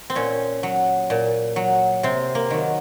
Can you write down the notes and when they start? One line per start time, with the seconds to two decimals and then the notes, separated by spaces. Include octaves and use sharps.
0.10 C4
0.15 A#2 C#4
0.63 F#3
1.10 A#2
1.56 F#3
2.03 C3 C4
2.35 A#3
2.50 D#3 F#3